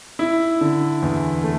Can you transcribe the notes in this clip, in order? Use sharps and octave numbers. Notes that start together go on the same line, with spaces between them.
E4
D3
E2
A3